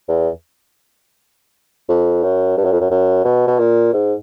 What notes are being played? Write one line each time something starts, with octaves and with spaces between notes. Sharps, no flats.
E2
F2
F#2
G2
F#2
F2
F#2
F#2
B2
B2
A#2
G#2